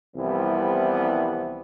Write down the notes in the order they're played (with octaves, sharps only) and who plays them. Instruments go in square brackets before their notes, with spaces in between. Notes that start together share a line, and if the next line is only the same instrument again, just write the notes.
[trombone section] C2 C3 E3 F3 G3 B3